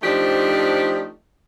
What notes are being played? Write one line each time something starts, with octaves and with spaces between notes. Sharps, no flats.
F3 A3 C4 D4 D#4 G4